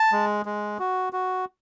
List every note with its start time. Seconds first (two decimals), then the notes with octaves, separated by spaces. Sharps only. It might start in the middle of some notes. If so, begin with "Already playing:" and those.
Already playing: A5
0.12 G#3
0.46 G#3
0.79 F#4
1.13 F#4